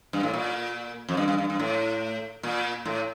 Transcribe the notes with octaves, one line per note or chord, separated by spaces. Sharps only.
G2
A2
A#2
F2
G2
G2
G2
G2
A2
A#2
A2